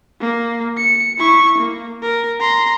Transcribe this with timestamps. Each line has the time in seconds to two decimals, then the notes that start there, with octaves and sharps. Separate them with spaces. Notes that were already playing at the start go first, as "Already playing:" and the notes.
0.20 A#3
0.77 C#7
1.18 E4 C#6
1.58 A#3
2.02 A#4
2.40 A#5 C6